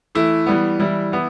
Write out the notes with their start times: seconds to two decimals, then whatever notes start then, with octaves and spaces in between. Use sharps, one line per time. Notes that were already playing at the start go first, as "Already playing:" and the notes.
0.15 E3 A3 E4
0.46 E3 G3 B3
0.80 E3 G3 E4
1.12 E3 B3 E4